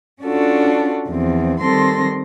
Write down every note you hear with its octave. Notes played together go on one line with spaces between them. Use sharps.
C#4 D4 F4 F#4 A4
E2 F3 C4
D#3 G3 C4 A4 C6 A#6